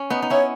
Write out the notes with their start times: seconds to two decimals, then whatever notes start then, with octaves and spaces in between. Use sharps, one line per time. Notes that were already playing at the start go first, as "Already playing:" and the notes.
Already playing: C#4
0.10 B3 D#4
0.22 D#4
0.30 C#4 E4 C#5